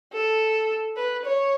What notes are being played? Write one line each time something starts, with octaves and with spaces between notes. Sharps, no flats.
A4
B4
C#5